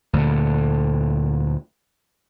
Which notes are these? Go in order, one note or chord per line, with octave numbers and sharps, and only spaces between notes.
D2 A#2 D3